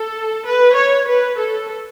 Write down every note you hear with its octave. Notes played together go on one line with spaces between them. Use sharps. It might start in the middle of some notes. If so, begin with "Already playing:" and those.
Already playing: A4
B4
C#5
B4
A4